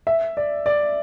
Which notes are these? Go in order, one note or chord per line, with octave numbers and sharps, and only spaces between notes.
E5
D5
D5